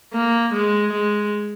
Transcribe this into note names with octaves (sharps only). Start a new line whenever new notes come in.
A#3
G#3
G#3